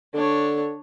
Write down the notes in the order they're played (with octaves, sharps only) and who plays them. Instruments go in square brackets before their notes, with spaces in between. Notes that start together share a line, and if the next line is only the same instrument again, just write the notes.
[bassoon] D3 [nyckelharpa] D4 C#5